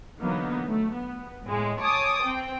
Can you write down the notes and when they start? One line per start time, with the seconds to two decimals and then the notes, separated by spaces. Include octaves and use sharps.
0.19 D3 E3 F#3 A#3 B3 D#4
0.65 A3
0.94 B3
1.46 A2 G#3
1.81 C#5 G#5 A5 D6 D#6
2.22 C4 G5